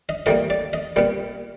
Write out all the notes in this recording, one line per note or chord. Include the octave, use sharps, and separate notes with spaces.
D#5
A2 E3 G3 A#3 D#5
D5
D#5
A#2 G3 B3